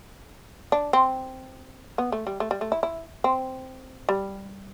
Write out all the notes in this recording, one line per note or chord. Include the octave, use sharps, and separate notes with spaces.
D4
C4
B3
A3
G3
A3
G3
A3
E4
E4
C4
G3